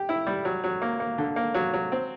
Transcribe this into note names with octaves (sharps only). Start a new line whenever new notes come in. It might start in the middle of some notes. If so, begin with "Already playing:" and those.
Already playing: G4
E4
G3
F#3
F#3
A#3
A#3
D3
A#3
F#3
F#3
C4